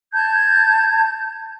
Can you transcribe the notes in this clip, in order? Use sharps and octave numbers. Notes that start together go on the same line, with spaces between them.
A5 G6 G#6